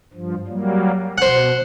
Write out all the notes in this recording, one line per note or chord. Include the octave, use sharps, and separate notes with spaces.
G2 F3
F#3 G3 A#3
B2 C5 F#5